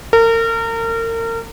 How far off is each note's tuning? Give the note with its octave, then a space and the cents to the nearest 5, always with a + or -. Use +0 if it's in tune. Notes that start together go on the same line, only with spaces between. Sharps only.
A#4 -35